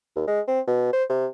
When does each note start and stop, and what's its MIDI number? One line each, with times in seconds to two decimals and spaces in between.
0.16 0.26 39
0.27 0.40 56
0.47 0.60 60
0.67 0.92 47
0.93 1.04 72
1.10 1.26 48